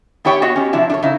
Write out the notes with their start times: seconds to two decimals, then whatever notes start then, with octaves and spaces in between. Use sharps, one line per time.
0.25 B3 E4 G4 C#5 D5 G5
0.42 B3 F#4 C#5 D#5 F#5
0.56 C#4 G4
0.73 C3 F3 D4 E4 F#4
0.90 D4 A4 C#5
1.03 C#3 D#4 E4